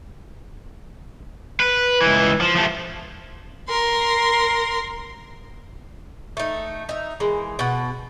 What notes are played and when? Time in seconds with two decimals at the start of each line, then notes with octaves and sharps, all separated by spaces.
1.60 B4
2.01 C#2 E3
2.41 F3
2.56 F3 A3
3.69 A#4 C6
6.37 A3 D#4
6.89 D#4 E5
7.20 E3 G#3 A#3
7.59 B2 F#5